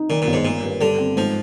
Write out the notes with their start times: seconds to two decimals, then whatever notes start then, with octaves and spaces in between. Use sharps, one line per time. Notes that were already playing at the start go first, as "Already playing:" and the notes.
Already playing: D#4
0.09 A#2 D#3
0.22 G1 A#2
0.33 G#2
0.45 A#2 A#3
0.63 G2
0.81 D3 G3
0.98 C4
1.17 G#2 F3